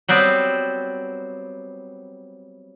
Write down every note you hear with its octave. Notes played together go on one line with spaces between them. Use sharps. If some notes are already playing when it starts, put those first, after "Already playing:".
F#3 G3 B3 C4